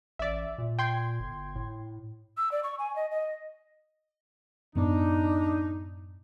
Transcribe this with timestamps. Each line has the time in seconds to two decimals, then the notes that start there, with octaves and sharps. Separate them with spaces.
0.19 A1 D5 E5
0.58 A#2
0.79 G5 C6 G#6
1.20 G1
1.55 A2
2.37 E6
2.52 D5
2.63 C#6
2.79 G#5
2.96 D#5
3.11 D#5
4.75 F#2 A2 B3 D4 D#4